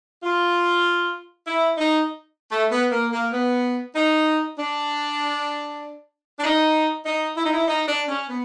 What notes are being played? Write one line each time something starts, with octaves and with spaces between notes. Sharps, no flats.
F4
E4
D#4
A3
B3
A#3
A#3
B3
D#4
D4
D4
D#4
D#4
E4
D#4
E4
D#4
D4
C#4
B3